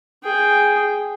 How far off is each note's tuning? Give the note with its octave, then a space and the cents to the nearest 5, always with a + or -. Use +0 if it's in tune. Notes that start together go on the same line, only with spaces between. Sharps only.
G#4 +0 G5 +0